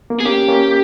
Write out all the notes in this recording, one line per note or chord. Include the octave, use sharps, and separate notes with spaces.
A#3
B3 G#4
A#3 C#4 G4
A#3 C#4